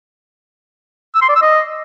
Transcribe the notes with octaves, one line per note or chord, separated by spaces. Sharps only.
E6
C6
D5
E6
D#5